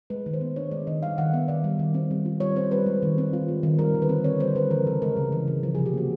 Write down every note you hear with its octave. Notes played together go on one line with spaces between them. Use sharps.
G#3 B4
D#3
C5
B3
D4 C#5
G#3 D5
D#3 D#5
G3 F5
D#3 F#5
B3 E5
D#3 D5
G3
D#3
C4
G3
F4
G3 C#5
C4 C5
G3 B4
G#3
D#3
C4
F4
G#3
D#3
G3 A#4
D3
B4
C4
D3 C#5
G3 C5
D3 B4
E3 A#4
C#3 A4
G#3 A#4
C#3
E3
C#3
F3
C3 G#4
G4
A#3 F#4